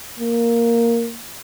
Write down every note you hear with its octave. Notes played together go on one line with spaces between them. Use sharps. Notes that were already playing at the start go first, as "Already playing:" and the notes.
A#3